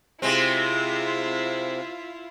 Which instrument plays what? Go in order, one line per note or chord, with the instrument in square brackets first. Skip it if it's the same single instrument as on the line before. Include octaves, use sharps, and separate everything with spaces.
[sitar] C3 G#3 C4 [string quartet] E4 F4